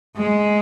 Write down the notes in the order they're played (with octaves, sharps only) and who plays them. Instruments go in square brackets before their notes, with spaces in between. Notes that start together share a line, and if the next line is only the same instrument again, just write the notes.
[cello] G#3